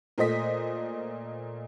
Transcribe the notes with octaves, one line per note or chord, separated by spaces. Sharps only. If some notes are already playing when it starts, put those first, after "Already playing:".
A#2 A3 C5 D#5 B6